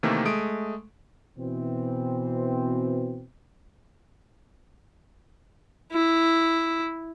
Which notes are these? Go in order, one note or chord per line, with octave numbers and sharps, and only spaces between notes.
C3 D#3 E3 A3 A#3
G#3 A3 D#6 D7
B2 E3 C4
E4